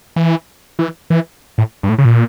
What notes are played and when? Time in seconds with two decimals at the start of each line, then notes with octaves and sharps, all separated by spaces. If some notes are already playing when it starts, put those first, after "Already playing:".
0.16 E3
0.79 E3
1.10 E3
1.58 A2
1.83 G2
1.89 A2
1.98 C#3
2.05 A#2